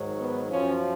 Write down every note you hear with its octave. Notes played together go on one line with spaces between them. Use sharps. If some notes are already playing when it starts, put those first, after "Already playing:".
Already playing: G#2 D#3 F#3
B3
F#2 F3 C#4